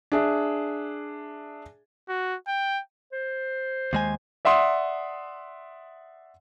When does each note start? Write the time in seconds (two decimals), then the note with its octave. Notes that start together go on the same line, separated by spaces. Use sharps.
0.12 D4 G#4 E5
2.09 F#4
2.48 G5
3.13 C5
3.93 D#2 G#3 G#5
4.45 D5 E5 F#5 C6 D#6